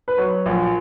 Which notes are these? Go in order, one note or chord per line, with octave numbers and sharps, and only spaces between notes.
B4
F#3 C#5
A#1